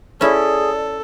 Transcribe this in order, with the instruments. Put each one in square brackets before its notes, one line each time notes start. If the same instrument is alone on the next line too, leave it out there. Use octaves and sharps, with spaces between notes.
[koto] C#4 E4 [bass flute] G#4 [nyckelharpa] A4 [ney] D5